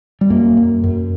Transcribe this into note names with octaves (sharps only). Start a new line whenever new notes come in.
G3
F#2 A#3
F#2
F#2